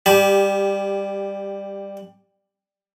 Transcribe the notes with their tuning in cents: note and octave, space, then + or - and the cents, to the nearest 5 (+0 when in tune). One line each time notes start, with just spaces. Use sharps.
G3 +15 G4 +0 A5 -45